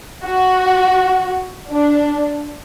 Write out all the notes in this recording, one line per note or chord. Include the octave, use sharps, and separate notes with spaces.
F#4
D4